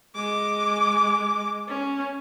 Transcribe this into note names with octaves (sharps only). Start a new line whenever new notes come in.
G#3 D6
C#4